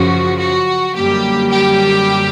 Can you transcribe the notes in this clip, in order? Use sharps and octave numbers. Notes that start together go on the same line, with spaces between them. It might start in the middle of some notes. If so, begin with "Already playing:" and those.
Already playing: F#2 C#3 F3 F#4
F#4
F#2 D3 G3 A#3 G4
G4